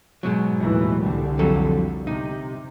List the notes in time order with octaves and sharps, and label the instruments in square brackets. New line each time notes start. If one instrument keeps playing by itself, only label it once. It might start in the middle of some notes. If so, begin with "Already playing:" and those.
[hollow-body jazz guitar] G#2 B2 F#3
[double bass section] D#2 A2 E3
C2 D3 G3
[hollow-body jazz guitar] F2 F#3 A4
[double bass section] C3 [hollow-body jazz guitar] D#4